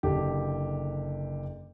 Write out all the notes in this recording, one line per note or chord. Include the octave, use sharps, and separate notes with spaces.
F#1 D3 G4